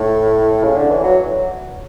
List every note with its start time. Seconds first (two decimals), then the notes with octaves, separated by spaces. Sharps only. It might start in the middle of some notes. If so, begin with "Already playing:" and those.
Already playing: A2
0.63 C#3
0.76 D3
0.91 E3
1.04 F#3